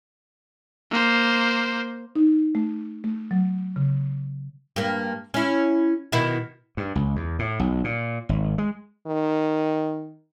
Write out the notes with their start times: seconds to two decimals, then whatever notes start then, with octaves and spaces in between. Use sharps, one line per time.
0.91 A#3 C5
2.16 D#4
2.55 A3
3.04 A3
3.31 F#3
3.76 C#3
4.76 G2 A#3
5.34 C#4 E4
6.12 B2 D#3 E4
6.77 G2
6.95 C#2
7.16 E2
7.39 A2
7.60 B1
7.84 A#2
8.29 G#1
8.58 G#3
9.07 D#3